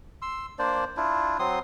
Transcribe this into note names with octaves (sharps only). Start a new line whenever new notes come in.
C6 E6
A#3 D4 C5 D5
D4 E4 F4
F#3 C4 C6 D#6